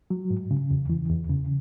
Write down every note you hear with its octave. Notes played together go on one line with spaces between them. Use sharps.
F#3
G#2
C#3
E2
E3
E2
C#3